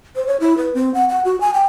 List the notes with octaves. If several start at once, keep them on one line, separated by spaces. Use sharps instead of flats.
C5
C#5
E4
B4
C4
F#5
F#5
F#4
G#5
G5